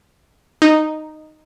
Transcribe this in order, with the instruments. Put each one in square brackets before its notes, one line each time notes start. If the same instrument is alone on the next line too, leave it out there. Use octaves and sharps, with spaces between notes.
[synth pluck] D#4